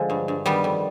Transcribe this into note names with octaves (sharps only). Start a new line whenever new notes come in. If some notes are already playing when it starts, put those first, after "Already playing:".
Already playing: D3 F3 G#3
G2
G2
D#3 G3 B3
F2